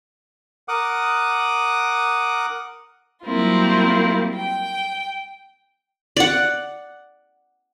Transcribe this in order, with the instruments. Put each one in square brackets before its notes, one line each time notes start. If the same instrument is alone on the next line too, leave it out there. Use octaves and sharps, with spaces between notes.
[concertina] A#4 F#5 D6 D#6
[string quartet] F#3 G3 A#3 C4 E4 F4
G5
[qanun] D5 F#5